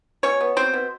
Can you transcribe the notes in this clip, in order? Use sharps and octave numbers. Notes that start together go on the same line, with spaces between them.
B2 C#4 C#5
B3
F#3 C4 C5
B2